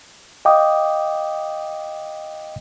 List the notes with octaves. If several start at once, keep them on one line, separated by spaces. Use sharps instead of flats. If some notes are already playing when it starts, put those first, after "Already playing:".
D#5 F5 G5 D6 D#6